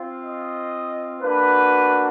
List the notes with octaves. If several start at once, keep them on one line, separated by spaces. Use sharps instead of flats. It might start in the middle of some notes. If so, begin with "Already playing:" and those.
Already playing: C4 F4
D#5
A#3 D4 F#4 B4